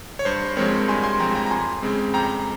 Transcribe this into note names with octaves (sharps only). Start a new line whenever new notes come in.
C#5
G2 C5
F3 G#3 C4 A#4 C#5
G2 G#5 C6
G#5 C6
F3 G#3 C4 G5 A#5
G5 A#5
A#5
F2 G#5 C6
C#3 G#3 C4
F2 G5 A#5